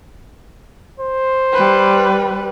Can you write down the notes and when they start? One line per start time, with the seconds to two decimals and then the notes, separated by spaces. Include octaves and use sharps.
1.00 C5
1.53 G3 B4